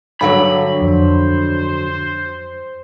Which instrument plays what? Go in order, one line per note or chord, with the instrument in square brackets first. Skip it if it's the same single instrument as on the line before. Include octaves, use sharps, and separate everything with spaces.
[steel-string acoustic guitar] G2 D3 F#3 [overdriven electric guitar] B5
[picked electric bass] F2 [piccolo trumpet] C5